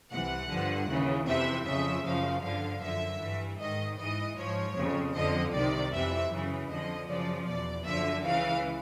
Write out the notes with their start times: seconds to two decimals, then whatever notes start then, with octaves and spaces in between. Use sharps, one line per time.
0.12 C2 C3 E3 F#5
0.50 G2 D3 F3
0.89 D#2 C#3 E3
1.27 F2 C3 E3 E5
1.66 F2 C#3 F3 E5
2.05 F#2 C#3 F3 F5
2.43 G2 D3 F3 F5
2.83 F#2 D3 F3 E5
3.21 G2 E3
3.60 G#2 D#3 D#5
3.98 G#2 E3 D#5
4.37 G#2 F3 C#5
4.76 F2 C#3 F3
5.16 F2 D3 F3 D#5
5.53 C2 C3 D#3 D5
5.93 F2 C3 E3 E5
6.32 F#2 C#3 E3
6.70 F2 D3 F3 D#5
7.09 F#2 C#3 F3 D5
7.47 E2 B2 D5
7.87 F#2 D3 F3 E5
8.25 C#2 C#3 E3 F5